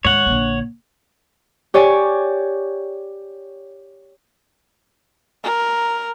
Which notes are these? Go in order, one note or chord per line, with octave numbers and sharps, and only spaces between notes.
G#2 D#3 C#5 F#5
A#1 D3
G4 C#5 D5 G#5
A#4